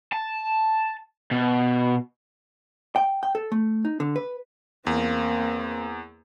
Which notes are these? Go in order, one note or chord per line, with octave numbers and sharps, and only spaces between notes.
A5
B2
G5
G5
A4
A3
D#4
D3
B4
E2 A#3 C4